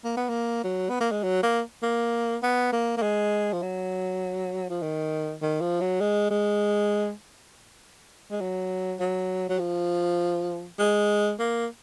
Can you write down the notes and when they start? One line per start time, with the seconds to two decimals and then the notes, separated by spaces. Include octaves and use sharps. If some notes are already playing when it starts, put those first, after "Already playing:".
0.04 A#3
0.17 B3
0.29 A#3
0.64 F#3
0.89 B3
1.00 A#3
1.11 G#3
1.23 F#3
1.43 A#3
1.82 A#3
2.42 B3
2.72 A#3
2.97 A#3
3.02 G#3
3.53 F3
3.62 F#3
4.69 F3
4.82 D#3
5.42 D#3
5.61 F3
5.80 F#3
6.00 G#3
6.30 G#3
8.31 G#3
8.41 F#3
8.99 F#3
9.49 F#3
9.59 F3
10.79 G#3
11.39 A#3